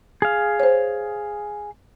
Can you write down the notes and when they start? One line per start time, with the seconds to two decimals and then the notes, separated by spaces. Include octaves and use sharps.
0.22 G#4 F5
0.60 C5 C#5